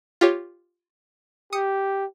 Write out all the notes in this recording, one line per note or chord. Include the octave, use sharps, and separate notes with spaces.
F4 G4 C#5
G4 D#6 C#7